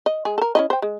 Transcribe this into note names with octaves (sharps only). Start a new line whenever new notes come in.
D#5
G#3 G#4
A4 A#4
C#4 E4 D#5
C5 G5
G#3